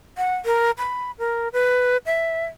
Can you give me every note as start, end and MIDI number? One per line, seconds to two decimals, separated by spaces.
0.18 0.35 78
0.46 0.71 70
0.78 1.11 83
1.19 1.48 70
1.53 1.97 71
2.06 2.45 76